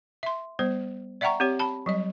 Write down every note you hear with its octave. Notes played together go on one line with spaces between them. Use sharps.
E5 C6
G3 B3 C5
D5 E5 F#5 G5 A#5 C#6
C4 G4 C#5
A5 B5
F#3 G3 D#5